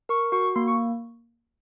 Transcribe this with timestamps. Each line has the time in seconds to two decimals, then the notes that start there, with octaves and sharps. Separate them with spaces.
0.09 A#4 C#6
0.32 F#4 C#6
0.55 A#3 C6
0.68 C#6